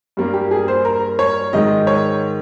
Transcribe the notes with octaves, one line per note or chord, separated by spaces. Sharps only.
G2 G3 A#3
G4
G#4
C5
A#4
C#5
G#2 D#3 G#3 D#5
C#5